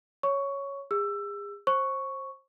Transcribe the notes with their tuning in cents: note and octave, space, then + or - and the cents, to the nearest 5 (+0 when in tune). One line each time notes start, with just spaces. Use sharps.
C#5 +0 C#6 +10
G#4 -40 E6 +20
C5 +25 C#6 +0